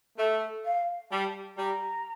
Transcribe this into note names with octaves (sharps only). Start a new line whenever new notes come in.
A3 E5
F5
G3 A5
G3 A#5